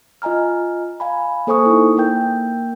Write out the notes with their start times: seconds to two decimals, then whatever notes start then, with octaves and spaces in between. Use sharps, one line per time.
0.22 F4 D#5 G#5 A#5 F6
1.00 F5 G#5 B5
1.47 A#3 A4 C5 G#5 C#6 D#6
1.66 D#4 E4
1.97 A#3 A#4 G5 G6